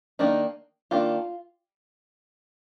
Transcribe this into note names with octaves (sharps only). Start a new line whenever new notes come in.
D#3 A#3 D4 D#4
D#3 A#3 D4 F4